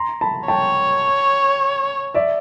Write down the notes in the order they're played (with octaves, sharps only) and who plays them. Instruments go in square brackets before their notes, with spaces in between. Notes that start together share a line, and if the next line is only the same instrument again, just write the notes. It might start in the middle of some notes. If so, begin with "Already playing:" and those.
Already playing: [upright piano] A#5 C6
A5 B5
[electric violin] C#5 [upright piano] G5 A5
[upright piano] D5 E5